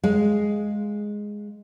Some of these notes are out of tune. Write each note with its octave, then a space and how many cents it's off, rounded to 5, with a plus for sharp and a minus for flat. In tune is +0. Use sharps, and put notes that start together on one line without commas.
G#3 +0 F5 +0